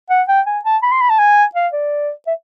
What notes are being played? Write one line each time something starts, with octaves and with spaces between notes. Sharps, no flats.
F#5
G5
G#5
A5
B5
C6
B5
A5
G#5
F5
D5
E5